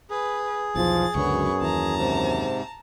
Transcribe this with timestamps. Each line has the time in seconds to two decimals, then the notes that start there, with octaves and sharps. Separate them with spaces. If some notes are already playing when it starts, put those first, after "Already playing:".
0.10 G#4 B4
0.76 B1 E2 F3 A6
1.15 C#2 F#2 D3 F#3 B3 C#6
1.62 D#2 E3 A5 A#5
1.98 G#2 C3